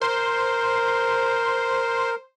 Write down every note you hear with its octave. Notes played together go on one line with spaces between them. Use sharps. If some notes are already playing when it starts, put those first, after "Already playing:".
A#4 C5